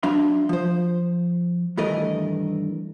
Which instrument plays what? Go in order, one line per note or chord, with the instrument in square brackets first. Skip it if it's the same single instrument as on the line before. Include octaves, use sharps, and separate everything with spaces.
[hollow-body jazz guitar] F#3 D4 E5 F5 C6
F3 C5
G2 D#3 E3 A3 A#4 D#5